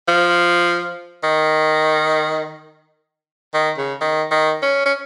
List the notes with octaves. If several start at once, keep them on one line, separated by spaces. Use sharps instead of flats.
F3
D#3
D#3
C#3
D#3
D#3
C#4
C#4